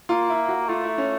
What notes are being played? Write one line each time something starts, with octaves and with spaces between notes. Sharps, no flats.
A#3 F4
E4
F#4
A3 F4
E4
C#4